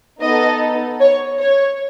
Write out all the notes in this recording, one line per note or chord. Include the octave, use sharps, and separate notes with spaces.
B3 D#4 A4 D#5
C#5
C#5